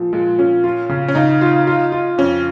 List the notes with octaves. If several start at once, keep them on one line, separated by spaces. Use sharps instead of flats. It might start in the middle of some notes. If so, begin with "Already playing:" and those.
Already playing: A#2 F3
A#2 G#3
A#2 C#4
F4
C#3
C#4
C#3 D#4
F4
F4
F4
F2 C#4